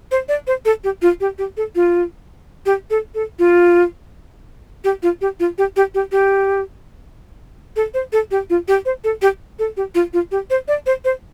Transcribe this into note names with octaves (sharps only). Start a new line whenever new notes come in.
C5
D5
C5
A4
G4
F4
G4
G4
A4
F4
G4
A4
A4
F4
G4
F4
G4
F4
G4
G4
G4
G4
A4
C5
A4
G4
F4
G4
C5
A4
G4
A4
G4
F4
F4
G4
C5
D5
C5
C5